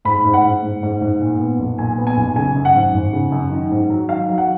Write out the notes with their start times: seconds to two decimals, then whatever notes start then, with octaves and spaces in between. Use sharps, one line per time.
0.05 G#2 B5
0.25 G#2
0.34 F#5
0.44 G#2
0.63 G#2
0.83 G#2
1.01 G#2
1.21 A#2
1.40 B3
1.59 B1
1.78 A#2 G#5
1.98 B3
2.07 G#5
2.17 B1
2.36 C#3 G#5
2.56 F#2
2.65 F#5
2.74 G#1
2.94 G#1
3.13 C#3
3.32 F#2
3.51 D#3
3.71 G#2
3.90 F#3
4.09 D#3 F5
4.29 F#3
4.38 F#5